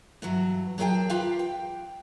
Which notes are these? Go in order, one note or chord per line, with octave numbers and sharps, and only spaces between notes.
G2 E3 F#3
F#3 G#4 A#4 B4 G5 A5
F4 G4 B4 F5
G5